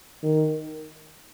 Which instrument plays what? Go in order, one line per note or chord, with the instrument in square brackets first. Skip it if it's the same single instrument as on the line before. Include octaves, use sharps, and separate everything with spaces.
[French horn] D#3